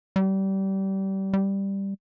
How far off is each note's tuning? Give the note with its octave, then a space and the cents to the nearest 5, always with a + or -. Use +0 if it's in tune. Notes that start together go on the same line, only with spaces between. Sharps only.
G3 -25
G3 +5